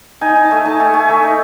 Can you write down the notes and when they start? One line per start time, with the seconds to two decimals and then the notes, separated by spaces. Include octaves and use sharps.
0.21 D#4 G#5
0.36 D#4
0.45 A5
0.51 A3 G#5
0.65 D#4 A5
0.80 A3 G#5
0.94 A3 G#5
1.09 A3 E5
1.23 D#4